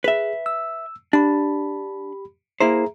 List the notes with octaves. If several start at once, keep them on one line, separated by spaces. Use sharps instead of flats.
G#4 B4 E5
E6
D4 G4 B5
A#3 E4 G#4 C5 E5 A#5